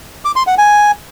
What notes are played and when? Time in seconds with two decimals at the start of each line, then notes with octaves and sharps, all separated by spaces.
0.25 D6
0.36 C6
0.47 F#5
0.58 G#5